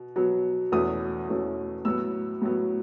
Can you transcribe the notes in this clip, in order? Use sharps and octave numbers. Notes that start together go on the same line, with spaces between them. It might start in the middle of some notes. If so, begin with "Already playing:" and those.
Already playing: B2
B2 F#3 B3
E2 B2 A3 C#4 D#6
E2 B2 A3 C#4
A2 F#3 B3 E6
A2 F#3 B3